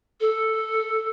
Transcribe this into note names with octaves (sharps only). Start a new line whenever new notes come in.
A4